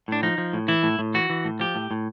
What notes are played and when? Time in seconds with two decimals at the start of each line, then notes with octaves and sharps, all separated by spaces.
0.08 A2 D4
0.23 F3 D#4
0.38 F3
0.53 A2
0.68 E3 E4
0.83 A2
0.99 A2
1.14 E3 F#4
1.30 E3
1.45 A2
1.60 F3 G4
1.75 A2
1.91 A2